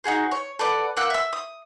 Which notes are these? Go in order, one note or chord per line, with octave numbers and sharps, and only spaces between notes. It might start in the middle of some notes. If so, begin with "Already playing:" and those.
D#4 F#4 G#4 C5
C#5
A4 B4 D5 F#5
A#3 F#5 E6 F#6
E5 E6
D#6